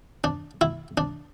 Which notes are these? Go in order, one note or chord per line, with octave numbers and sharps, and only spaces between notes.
D4
E4
D4